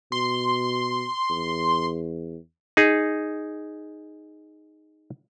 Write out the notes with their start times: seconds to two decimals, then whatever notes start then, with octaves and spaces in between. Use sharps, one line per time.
0.12 B2 C6
1.30 E2
2.77 D#4 G#4